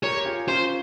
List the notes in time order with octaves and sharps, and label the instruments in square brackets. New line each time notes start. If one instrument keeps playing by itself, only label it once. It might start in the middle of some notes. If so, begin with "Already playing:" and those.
[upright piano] G4 A#4 [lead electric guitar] C#5
[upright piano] G4
F4 G#4
[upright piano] C#4 F4 [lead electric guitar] C5